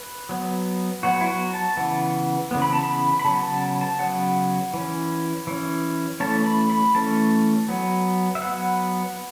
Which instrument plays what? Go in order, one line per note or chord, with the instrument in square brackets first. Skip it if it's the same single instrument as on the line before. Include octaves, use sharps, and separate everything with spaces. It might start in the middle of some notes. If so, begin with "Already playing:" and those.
Already playing: [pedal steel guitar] B4
F#3 B3
F#3 B3 F#4
E4
F#4
A5
C#3 E3 B3 F#5
C#3 E3 B3
B5
A5
B5
B5
C#3 F#3 B3 A5
A5
A5
C#3 F#3 B3 F#5
E3 C#4
E3 C#4
E3 A3 C#4 A5
B5
B5
E3 A3 C#4 A5
F#3 B3
E5
F#3 B3 F#5